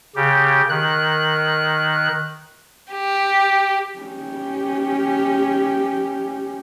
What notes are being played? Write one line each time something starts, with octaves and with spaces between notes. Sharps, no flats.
C#3 G4
D#3 F#6
G4
C#4 G4